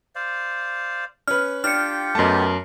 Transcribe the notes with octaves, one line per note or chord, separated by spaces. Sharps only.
C5 D5 F5
C#4 B4 F6
D4 F4 G4 G5 F6 C#7
F#2 A3 B3 D#5 A5